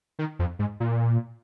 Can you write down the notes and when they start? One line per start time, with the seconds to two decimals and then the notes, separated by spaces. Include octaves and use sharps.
0.19 D#3
0.39 F2
0.59 G#2
0.80 A#2